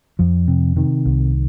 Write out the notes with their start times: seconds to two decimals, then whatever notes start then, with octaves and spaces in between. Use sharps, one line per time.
0.19 F2 F3
0.48 C3
0.76 C3 D#3
1.06 C2